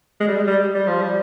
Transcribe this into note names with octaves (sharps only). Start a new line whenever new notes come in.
G#3
G3
G#3
G3
G3
F3
G3